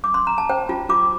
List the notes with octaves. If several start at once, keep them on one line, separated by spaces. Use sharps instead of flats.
D6
C6
A#5
A5
C5 G5
F4
F4 D6